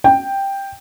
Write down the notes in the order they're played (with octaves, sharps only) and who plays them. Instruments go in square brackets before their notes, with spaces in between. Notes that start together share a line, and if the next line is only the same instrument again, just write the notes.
[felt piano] G5